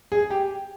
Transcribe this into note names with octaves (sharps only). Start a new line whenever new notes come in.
G#4
G4